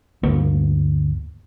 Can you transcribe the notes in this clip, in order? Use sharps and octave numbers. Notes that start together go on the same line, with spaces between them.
G1 D2 A#3